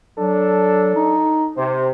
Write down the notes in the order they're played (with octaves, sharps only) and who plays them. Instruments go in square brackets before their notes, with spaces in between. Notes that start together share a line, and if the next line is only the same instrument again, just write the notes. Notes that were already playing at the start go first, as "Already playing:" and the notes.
[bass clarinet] F#3 [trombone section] D4 A4
[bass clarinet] D#4
[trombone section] C3 [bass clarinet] C5